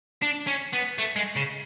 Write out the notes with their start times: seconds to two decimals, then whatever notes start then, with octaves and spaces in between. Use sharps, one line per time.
0.22 D4
0.47 C#4
0.73 B3
0.98 A3
1.16 G#3
1.36 C#3